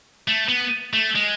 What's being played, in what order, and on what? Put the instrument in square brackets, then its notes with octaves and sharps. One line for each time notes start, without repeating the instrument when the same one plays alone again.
[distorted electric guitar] A3
B3
A3
G#3